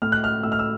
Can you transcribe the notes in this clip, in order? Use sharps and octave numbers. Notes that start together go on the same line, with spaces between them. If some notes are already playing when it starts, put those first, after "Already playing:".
A2 F6
F#6
F6
A2 E6
F6
E6